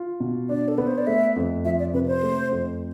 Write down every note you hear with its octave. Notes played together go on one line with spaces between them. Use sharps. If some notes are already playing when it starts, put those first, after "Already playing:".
Already playing: F4
B2
D4 D5
A4
B3 B4
C5
D5
A3 E5
F2
F3 E5
D5
C3 B4
C5
A3
F2